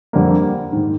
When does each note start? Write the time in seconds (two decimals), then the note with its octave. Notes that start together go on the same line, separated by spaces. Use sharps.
0.13 F2 D3 G3 A#3
0.72 G#2 D#3